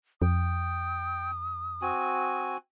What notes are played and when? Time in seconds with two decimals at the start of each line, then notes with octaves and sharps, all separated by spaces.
0.22 F2 G5 D#6
1.82 C4 F#4 G#5